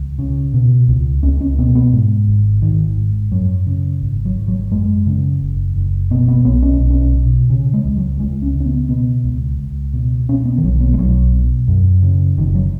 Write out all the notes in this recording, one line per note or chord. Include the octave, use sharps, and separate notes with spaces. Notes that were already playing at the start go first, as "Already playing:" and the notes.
Already playing: C#2
C#3
B2
C#2
C#2 C#4
C#4
B2 B3
B3
G#2
G#1
G#1 D#3
G#2
F#2 F#3
C#3
G#1
F#3
G#1
F#3
F#2 G#3
C#3
F#1
F#1
B2 B3
B3
B1 B3
C#4
B1
C#4
B2
C#3
G#3
C#2
F#3
C#2 G#3
C#4
C#3
C#4
B3
B2 B3
C#2
C#2
B2
B2 C#4
B3
D#3
B1 F#3
B3
G#3
B1 F#3
B2
F#2
C#3
F#1 D#3
F#3